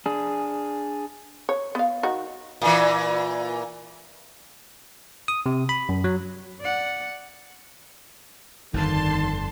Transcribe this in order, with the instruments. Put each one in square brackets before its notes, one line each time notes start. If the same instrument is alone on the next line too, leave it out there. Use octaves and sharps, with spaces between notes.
[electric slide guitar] D4 G#4
[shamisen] C#5
B3 F5
D#3 F#4
[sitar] A#2 E3
[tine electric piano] D#6
C3
B5
F#2
F#3
[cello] D5 F#5
[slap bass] G1 F2 [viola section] D3 A5 C6 [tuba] D#3